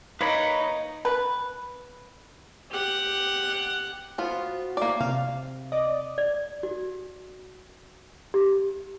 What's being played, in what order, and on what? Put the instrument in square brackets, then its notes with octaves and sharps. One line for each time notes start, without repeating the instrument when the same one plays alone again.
[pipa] A#3 [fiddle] D#4 [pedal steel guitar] B4 C#5 B5
[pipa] B4
[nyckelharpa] G4 F#5
[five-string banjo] B3 F4 [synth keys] F#4 C5
[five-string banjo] A#3 D5
[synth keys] C3 [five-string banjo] F5
[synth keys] D5 D#5
[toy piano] D5
F#4
G4